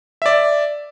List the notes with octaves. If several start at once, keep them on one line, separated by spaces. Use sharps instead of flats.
D5 E5